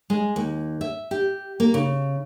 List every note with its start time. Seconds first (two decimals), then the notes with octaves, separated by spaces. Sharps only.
0.10 G#3
0.36 D#2
0.81 E5
1.11 G4
1.60 A#3
1.74 C#3